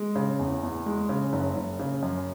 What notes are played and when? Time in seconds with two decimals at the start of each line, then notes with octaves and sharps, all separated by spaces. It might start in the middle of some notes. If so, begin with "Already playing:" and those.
Already playing: G#3
0.16 C#3
0.39 E2
0.63 E2
0.86 G#3
1.09 C#3
1.33 F#1
1.56 F#1
1.79 C#3
2.03 F#2